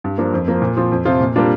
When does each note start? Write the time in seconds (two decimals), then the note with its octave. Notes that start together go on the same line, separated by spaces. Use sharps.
0.04 G2
0.18 F3 A#3 D4
0.34 F2
0.48 F3 A#3
0.62 A#2
0.77 F3 C4 F4
0.92 F2
1.05 C3 F3 C4 F4
1.20 A#2
1.36 G3 A#3 D4 F4